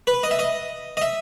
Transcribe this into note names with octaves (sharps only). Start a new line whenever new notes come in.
B4
D#5
E5
D#5
D#5
E5